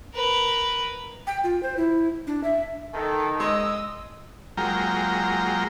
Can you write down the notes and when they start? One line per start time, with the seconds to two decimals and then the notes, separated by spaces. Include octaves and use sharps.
0.15 A#4 B4
1.27 G5
1.44 F4
1.63 C5
1.77 E4
2.27 D4
2.44 E5
2.95 D#3 A4
3.40 G#3 D#5 E6
4.57 F#3 G#3 A#3 F4 G5 A#5